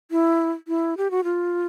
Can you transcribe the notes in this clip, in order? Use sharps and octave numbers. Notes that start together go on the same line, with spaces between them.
E4
E4
G4
F#4
F4